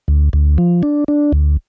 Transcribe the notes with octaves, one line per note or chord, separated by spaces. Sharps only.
D2
D2
F3
D4
D4
D2